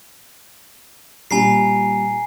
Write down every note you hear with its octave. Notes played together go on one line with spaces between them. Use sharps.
A#2 G3 G#5 A#5 C7